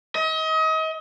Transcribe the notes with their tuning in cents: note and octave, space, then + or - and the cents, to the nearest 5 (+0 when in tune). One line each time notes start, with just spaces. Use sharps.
D#5 +35